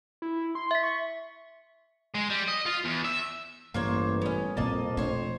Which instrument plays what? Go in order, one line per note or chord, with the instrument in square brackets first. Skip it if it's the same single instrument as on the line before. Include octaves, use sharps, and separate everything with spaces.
[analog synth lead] E4
C6
[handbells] E5 B6
[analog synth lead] C#6
[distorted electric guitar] G#3
G3
D#5
F4
E2
E5
[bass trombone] A1 [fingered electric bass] G2 G3 [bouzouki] A#3 C5 C#5
[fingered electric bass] G3 [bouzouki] B3 C#4
[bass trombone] F2 [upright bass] A#2 C4 [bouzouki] A#3 D#5 A5
[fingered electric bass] B2 A3 [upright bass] D4 [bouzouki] C5 C#5